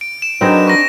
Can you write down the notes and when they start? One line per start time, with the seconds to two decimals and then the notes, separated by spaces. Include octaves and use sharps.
0.01 D7
0.22 E7
0.41 F#3 C4 D4 D#4 G#4 A#4 B4
0.67 C#6 A#6